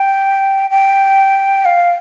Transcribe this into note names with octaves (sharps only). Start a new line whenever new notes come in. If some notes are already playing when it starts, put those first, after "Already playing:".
Already playing: G5
G5
F5